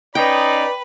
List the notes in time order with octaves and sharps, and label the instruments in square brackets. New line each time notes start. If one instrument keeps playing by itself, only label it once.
[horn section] C#4 D#4 [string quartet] B4 [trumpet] D5 [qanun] G5